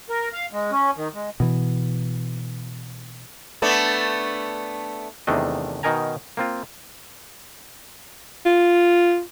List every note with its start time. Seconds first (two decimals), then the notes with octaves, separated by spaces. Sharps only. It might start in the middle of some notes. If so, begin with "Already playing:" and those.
0.09 A#4
0.33 F5
0.53 G#3
0.71 C#4
0.97 D#3
1.14 G#3
1.40 B2 E3
3.62 A3 B3 D4
5.27 E2 C3 D#3 A3 D4 D#5
5.83 B2 D#3 D#4 A#4 G#5 A#5
6.37 A#3 C4 F4
8.46 F4